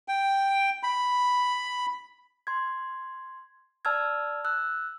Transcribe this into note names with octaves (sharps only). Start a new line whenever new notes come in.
G5
B5
C6 G#6
D5 A5 E6 F6 G#6
E6 F#6